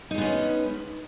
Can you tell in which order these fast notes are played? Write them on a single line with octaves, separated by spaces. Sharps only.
D#4 G#3 B3 C#4